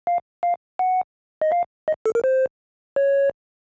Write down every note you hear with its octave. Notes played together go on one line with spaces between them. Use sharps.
F5
F5
F#5
D#5
F5
D#5
A4
A#4
C5
C#5